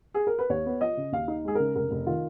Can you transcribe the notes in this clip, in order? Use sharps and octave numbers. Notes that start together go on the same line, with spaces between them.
G#4
A#4
B4
D#2 C#5
B3
F3 D#5
C#3
D#2 F5
D#4
G#3 G#4
C#3 A#4
F1 A#4
F1
D#3 F4